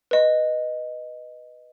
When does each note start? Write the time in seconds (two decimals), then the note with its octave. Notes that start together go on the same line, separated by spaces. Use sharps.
0.11 B4 D#5